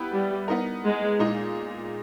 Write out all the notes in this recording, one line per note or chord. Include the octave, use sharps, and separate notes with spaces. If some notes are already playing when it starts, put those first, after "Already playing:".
Already playing: B3 E4 G4 B4
G3
B3 D#4 A#4
G#3
A#2 G#3 D#4